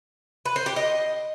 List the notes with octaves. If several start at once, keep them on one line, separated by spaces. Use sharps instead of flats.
B4
C5
G4
D#5